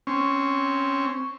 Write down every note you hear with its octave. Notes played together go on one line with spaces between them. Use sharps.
C4 C#4